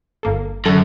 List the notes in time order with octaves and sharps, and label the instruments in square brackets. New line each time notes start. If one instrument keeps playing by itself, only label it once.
[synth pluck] G1 A#3 A4
[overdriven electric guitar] F#2 [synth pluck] D3 A4